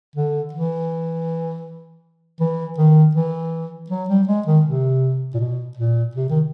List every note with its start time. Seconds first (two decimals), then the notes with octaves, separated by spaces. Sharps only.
0.15 D3
0.53 E3
2.40 E3
2.78 D#3
3.15 E3
3.90 F#3
4.08 G3
4.27 G#3
4.46 D#3
4.65 C3
5.34 A#2
5.39 B2
5.77 A#2
6.15 C3
6.29 D#3